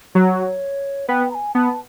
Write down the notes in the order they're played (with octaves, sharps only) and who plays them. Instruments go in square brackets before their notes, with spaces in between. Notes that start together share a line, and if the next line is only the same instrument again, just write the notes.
[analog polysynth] F#3 [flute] C#5
[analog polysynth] B3 [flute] G5
[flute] A#5
G#5
[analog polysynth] B3 [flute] A5